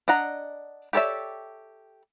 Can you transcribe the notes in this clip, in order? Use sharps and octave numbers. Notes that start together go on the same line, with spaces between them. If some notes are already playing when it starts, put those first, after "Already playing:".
D4 D#5 F#5 A#5
G4 A4 C#5 D5 E5